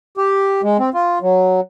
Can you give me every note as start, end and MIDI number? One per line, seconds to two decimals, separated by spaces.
0.17 0.61 67
0.63 0.77 56
0.79 0.90 60
0.94 1.19 65
1.22 1.60 54